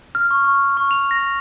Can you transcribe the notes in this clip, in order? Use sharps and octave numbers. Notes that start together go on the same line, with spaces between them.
F6
C#6
C#6
C#6
F7
A#6